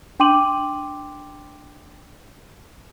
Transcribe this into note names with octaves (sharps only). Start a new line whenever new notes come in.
D4 G5 C6 D6 D#7 F#7